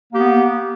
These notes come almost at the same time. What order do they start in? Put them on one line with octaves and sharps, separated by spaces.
A#3 G4 B3